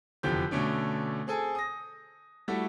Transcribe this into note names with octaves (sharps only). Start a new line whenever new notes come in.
F1 E2 D3 F3 G4 G6
B2 D3 A3 C#4 D4
C4 G#4 A4 G#5
D#6 A#6
G3 A3 E4 F#4 A4